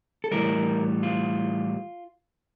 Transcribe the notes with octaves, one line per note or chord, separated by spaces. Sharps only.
A4
A2 E3 G3 A#4
F4